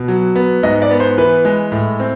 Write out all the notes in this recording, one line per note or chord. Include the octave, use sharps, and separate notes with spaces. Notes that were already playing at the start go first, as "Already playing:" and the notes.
Already playing: B2
F#3
B3
G#2 D#5
D5
B3
C5
E3 B4
G#3
A2
C4